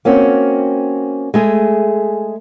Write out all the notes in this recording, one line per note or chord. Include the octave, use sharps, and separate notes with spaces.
A#3 C4 C#4 F#4
G#3 A3 G#4